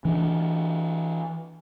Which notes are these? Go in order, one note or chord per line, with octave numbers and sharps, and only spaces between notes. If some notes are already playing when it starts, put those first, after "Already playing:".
E3 D4